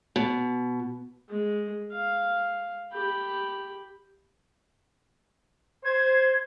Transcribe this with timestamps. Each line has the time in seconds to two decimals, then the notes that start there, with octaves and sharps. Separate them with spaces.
0.16 B2
1.29 G#3
1.92 F5
2.93 G4 B5
5.85 C5 G#6